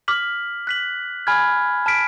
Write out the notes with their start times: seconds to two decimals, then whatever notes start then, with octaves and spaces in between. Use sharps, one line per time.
0.08 D6 F6 B6 F#7
0.67 F#6 B6 F#7
1.27 G#5 B5 F6 G#6
1.86 A5 F6 B6 D7